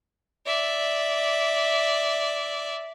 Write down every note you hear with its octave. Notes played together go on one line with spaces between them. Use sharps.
D5 E5